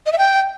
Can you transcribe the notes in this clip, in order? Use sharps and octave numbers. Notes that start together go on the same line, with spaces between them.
D#5
E5
G5